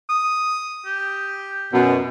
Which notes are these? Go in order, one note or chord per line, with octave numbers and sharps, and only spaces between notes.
D#6
G4
F#2 B2